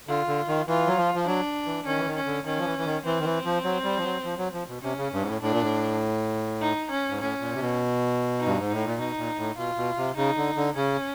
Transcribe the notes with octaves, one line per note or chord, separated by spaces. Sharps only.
D3 F4
D3
D#3
E3 F4
F#3
F3
F3
F#3 D4
E3
D#3 C#4
E3
D#3
C#4
D3
D#3 C#4
F3
E3
E3
D#3
E3 C4
D#3
E3
F3
F#3
G3
F3
F#3
F3
F#3
F3
B2
C3 C#4
C#3
G2
G#2
A2
A2 D4
A#2
A2
D#4
C#4
G#2
A2 C#4
A#2
C3
B2
D#4
G2
G#2
A2 D#4
A#2
B2 D#4
A#2
A2
B2 F4
B2
C3
C#3 D#4
D3
D3
C#3 C#4